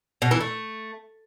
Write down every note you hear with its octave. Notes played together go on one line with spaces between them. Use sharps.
B2
E3
A3